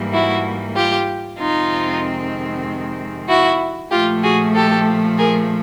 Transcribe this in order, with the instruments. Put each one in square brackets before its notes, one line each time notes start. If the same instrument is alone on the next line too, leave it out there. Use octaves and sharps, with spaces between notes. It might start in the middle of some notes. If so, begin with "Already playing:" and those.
Already playing: [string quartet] G#2 E3 G3 A#3
E4 F#4
F4 G4
F2 C3 D#3 G#3 C4 D#4 F4
E4 F#4
A#2 F3 A3 F4 G4
F#4 G#4
G4 A4
G#4 A#4